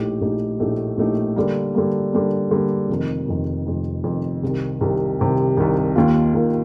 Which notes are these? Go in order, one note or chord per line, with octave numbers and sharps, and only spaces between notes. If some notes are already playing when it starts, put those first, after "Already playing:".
Already playing: A#1 A2 A3 D#4 G4
A#1 A2 A3 D#4 G4
A#1 A2 A3 D#4 G4
A#1 A2 A3 D#4 G4
D3 G3 A#3
D3 G3 A#3
D3 G3 A#3
D3 G3 A#3
F1 F2 D#3
F1 F2 D#3
F1 F2 D#3
F1 F2 D#3
C2 C3 D#3
C2 C3 D#3
C2 C3 D#3
C2 C3 D#3
D#2 D#3 A#3 F4
D#2 D#3 A#3 F4